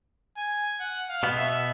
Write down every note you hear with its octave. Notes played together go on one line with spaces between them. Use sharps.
G#5
F#5
F5
B2 B3
E5